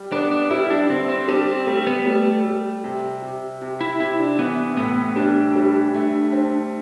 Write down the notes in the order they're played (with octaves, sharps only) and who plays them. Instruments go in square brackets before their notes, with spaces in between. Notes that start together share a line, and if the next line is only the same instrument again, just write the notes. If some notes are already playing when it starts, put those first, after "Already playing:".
Already playing: [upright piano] G3
[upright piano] B3 [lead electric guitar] D4
[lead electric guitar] D4
[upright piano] G3 [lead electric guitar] E4
[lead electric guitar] D4
[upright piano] D3 [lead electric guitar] C4
[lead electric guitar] C4
[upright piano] G3 [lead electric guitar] D4
[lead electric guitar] C4
[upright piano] G3 [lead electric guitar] A3
[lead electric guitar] B3
[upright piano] G3 [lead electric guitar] A3
[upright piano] G3
C3
C3
C3
[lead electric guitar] E4
[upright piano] C3 [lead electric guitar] E4
[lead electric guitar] D4
[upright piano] E3 [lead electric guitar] B3
[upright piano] A2 [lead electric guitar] B3
[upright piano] G3 [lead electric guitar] D4
[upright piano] G3
A3
C4